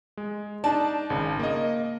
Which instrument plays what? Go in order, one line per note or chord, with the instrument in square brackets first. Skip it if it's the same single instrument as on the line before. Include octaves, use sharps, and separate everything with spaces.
[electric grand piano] G#3
[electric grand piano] D4 D#4 D5 [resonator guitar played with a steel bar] A5
[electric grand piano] G#1 C#3
A#3 D#5